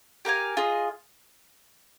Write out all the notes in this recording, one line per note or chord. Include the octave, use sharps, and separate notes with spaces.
G4 A#4 F5 G#5
F4 G#4 D#5